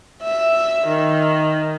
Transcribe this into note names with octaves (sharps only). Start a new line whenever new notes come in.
E5
D#3